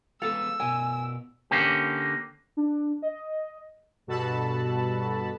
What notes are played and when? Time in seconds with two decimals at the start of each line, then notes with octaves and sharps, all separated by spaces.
0.22 G#3 B3 A4 F5 E6
0.60 B2 A#4 G#5
1.51 D3 A#3 C#4 G4
2.57 D4
3.02 D#5
4.07 G2 B2 F#4 A4 A5 B5